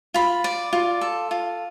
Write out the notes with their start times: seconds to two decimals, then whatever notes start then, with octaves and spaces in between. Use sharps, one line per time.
0.14 F4 B5
0.44 D5
0.73 F4
1.01 A4
1.31 F4